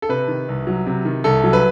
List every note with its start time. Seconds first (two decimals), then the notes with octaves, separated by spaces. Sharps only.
0.02 A4
0.09 C3 B4
0.28 D#3
0.48 C2
0.67 F#3
0.86 C3
1.05 D#3
1.24 C2 A4
1.44 F#3
1.53 B4